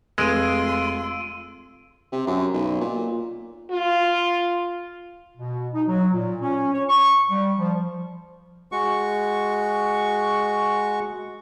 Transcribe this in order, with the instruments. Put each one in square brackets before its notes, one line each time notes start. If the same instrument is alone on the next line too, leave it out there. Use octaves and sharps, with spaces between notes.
[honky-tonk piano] F1 [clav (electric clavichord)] G#3 [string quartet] F4 C6 [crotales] E6 D7 D#7
[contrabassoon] C3
F#2
B1
A#2
[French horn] F4
[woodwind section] B2
D#4
F#3
A#2
C#4
C#5
C#6
G3
F3
[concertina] G#3 F#4 C#6